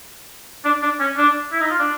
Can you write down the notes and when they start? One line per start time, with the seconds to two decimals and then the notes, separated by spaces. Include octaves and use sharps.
0.65 D4
0.82 D4
1.00 C#4
1.17 D4
1.53 E4
1.61 D#4
1.71 F4
1.79 D4